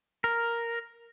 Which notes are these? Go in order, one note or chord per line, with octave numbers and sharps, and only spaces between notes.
A#4